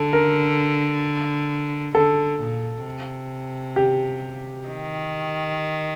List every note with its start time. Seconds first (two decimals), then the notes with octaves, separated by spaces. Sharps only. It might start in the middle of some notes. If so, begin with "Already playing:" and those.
Already playing: D3 A4
0.13 A#4
1.95 D3 A4
2.40 A#2
2.86 C3
3.76 G4
4.67 D#3